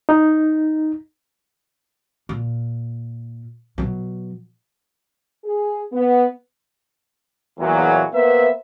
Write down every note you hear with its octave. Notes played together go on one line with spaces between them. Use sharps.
D#4
A#2
B2 F#3
G#4
B3
E2 A#2 F#3
A#3 B3 B4 C5 E5